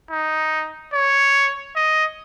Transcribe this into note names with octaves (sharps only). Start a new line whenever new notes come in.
D#4
C#5
D#5